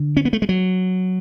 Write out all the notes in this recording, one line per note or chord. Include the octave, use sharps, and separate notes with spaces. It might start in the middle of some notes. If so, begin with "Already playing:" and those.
Already playing: D3
C#4
B3
A3
G#3
F#3